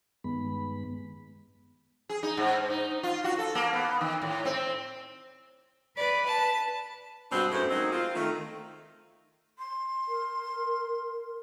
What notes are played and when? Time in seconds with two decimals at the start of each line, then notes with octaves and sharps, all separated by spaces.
0.24 G2 D#3 G#3 B3 B5
2.09 G#4
2.23 D#4
2.37 G#2
2.70 D#4
3.03 F4
3.24 F#4
3.39 A4
3.55 A#3
3.73 B3
4.01 D#3
4.22 A2
4.45 C4
5.97 B4 D5
6.26 A5
7.31 G2 B2 G#3 C4 D4 F#4
7.52 F#2 A2 G#3 A3 C5
7.70 F#3 G#3 A#3 C4 D#4
7.92 C4 F4
8.15 D#3 A3
9.58 C6
10.08 A#4